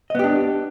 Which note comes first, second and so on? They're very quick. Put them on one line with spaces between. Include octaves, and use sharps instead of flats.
D#5 B3 G4 D4